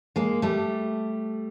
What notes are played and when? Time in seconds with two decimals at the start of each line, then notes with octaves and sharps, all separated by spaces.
0.16 G#3 A#3
0.42 G3 A3